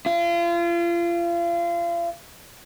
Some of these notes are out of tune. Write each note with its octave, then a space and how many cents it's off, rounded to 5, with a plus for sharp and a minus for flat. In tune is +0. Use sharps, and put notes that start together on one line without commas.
F4 -35